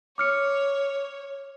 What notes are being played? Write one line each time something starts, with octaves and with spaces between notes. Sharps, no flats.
C#5 D6 F6 C#7